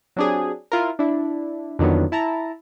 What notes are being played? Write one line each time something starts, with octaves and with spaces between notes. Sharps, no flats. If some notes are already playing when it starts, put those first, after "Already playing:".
F#3 C4 D4 G4 G#4
E4 F4 A#4
D4 E4
F2 D3 D#3 F#3 B3
E4 A5 A#5